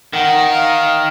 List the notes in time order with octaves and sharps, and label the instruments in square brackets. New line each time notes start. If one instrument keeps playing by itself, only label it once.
[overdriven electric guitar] D#3 [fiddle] F#5
[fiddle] F5